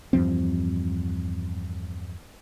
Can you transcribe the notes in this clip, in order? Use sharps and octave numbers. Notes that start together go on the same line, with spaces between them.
E2 G2 F3 C4